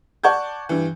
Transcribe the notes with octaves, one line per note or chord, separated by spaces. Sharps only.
D5 F#5 A5 C#6 G6 G#6
G2 E3